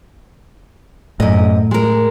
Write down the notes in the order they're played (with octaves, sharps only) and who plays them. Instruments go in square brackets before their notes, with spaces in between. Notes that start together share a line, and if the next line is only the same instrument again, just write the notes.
[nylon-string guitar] F#2 D#5 [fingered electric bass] A2
[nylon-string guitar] G#3 A#4